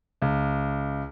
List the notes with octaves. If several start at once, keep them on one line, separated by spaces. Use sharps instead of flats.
C#2